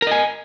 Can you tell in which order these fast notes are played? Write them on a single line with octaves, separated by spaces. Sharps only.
A#4 D#5 G#5